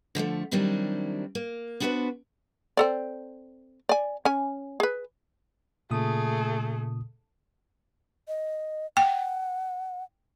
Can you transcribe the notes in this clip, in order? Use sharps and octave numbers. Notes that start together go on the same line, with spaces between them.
D3 F3 G3 A3
D#3 F#3 G3 C4 D4 E4
A#3
B3 D4 F#4 A4 B4 C5
C4 A4 D5
D5 G#5
C#4 G#5
G#4 B4
A#2 C#3 A3 G#4 D#6
D#5
F#5 G5